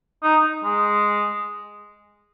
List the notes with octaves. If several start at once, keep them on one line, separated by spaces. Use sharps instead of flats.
D#4
G#3